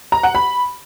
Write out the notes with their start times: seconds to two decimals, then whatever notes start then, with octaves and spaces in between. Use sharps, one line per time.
0.12 A#5
0.23 F#5
0.35 B5